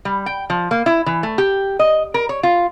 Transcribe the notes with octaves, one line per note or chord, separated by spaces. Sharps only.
G3
G5
F3
A#3
E4
E3
A3
G4
D#5
A#4
C#5
F4